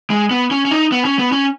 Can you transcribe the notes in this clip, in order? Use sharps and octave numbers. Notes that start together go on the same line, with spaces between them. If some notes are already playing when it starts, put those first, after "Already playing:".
G#3
B3
C#4
C#4
D#4
B3
C#4
B3
C#4